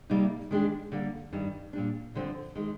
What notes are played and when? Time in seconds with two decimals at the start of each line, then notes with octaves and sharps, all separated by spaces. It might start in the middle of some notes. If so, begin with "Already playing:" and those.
0.10 C3 G3 A#3 D#4
0.51 D#3 G#3 D4 G4
0.92 D3 G3 A#3
1.33 G2 D#3 G3
1.73 A#2 G3 D4
2.15 G2 D3 F3 C4
2.55 D#3 G#3